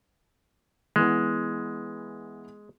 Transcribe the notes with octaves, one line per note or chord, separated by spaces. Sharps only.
E3 G#3 B3